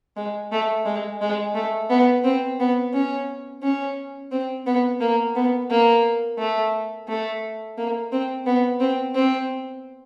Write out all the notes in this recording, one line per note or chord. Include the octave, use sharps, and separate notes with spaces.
G#3
A3
G#3
G#3
A3
B3
C4
B3
C#4
C#4
C4
B3
A#3
B3
A#3
A3
A3
A#3
C4
B3
C4
C4